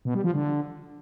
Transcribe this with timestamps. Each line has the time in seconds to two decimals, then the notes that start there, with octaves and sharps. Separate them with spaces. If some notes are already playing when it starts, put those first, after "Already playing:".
0.05 B2
0.15 G3
0.24 F3
0.34 D3